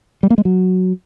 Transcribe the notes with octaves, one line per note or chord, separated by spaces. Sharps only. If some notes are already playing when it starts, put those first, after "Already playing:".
G3
A#3
G#3
F#3